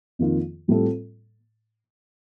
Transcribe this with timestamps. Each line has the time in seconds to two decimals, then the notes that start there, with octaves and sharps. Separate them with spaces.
0.19 F2 D#3 A#3 F4
0.68 A2 G3 C4 F4 A4